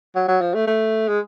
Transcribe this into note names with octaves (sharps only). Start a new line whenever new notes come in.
F#3
F#3
F3
A3
A3
G#3